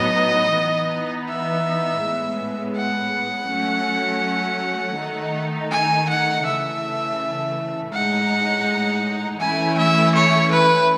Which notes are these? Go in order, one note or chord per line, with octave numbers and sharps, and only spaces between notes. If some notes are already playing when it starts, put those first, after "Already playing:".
Already playing: A2 F#3 B3 D#4 D#5
E3 B3 D#4
E5
A2 G#3 B3
F#5
F#3 A3 C#4
D#3 A3 D#4
G#5
F#5
C#3 E3 A3 E5
A2 G#3 D#4 F#5
E3 A3 C#4 E4 G#5
E5
C#5
B4